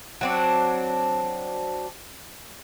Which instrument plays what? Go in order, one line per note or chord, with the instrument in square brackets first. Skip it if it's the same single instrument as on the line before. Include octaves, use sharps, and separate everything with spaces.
[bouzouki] F#3 C4 D4